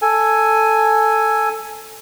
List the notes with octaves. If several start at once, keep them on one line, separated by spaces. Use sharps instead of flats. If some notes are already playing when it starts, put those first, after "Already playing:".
A4 G#5